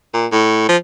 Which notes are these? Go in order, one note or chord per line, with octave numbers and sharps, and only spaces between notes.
A#2
A2
F3